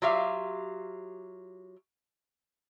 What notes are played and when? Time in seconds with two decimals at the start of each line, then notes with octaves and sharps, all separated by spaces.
0.02 F#3 F4 G4 E5 F5